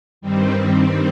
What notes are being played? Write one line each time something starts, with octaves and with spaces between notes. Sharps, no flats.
G2 D#3 G3 C4